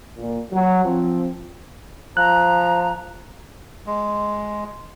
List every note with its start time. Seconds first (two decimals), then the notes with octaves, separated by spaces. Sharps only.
0.17 A#2
0.52 F#3
0.85 F3 C4
2.17 F3 A#5 F#6
3.87 G#3